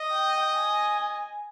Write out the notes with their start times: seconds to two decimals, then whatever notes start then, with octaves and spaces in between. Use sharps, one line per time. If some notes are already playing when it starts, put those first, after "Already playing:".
Already playing: D#5
0.11 G5
0.55 G#5